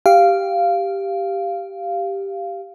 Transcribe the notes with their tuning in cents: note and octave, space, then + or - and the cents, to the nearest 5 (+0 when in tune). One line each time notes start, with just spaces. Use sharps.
G4 +0 F5 -10